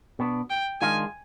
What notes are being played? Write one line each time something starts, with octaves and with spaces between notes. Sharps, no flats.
B2 B3 D4
G5
D#3 G#3 D4 F4 G#5